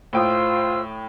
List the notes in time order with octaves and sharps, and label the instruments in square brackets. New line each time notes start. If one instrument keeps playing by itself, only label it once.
[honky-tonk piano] A2 G5 D#6 [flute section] F4 C5 E6